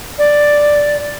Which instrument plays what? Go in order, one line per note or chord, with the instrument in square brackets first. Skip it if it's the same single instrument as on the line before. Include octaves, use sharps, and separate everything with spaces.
[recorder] D5